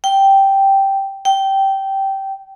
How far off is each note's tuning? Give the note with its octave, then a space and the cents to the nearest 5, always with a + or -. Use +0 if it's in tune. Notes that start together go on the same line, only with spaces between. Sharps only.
G5 -5
G5 -15